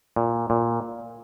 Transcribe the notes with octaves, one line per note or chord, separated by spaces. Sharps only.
A#2
A#2